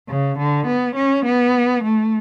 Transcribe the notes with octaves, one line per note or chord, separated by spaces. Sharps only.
C#3
D3
B3
C#4
B3
A3